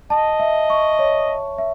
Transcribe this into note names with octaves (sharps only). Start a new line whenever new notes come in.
D#5 A5
E5
C#6
C#5
A5
E5